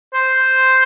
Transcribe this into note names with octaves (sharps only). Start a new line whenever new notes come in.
C5